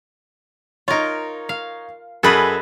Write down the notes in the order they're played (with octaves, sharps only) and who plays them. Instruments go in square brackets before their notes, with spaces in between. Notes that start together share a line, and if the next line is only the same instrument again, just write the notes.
[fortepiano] D#4 C#5 [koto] F4 A#4
[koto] F5
[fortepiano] F#2 G#4 B5 [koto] A4 B4 D#5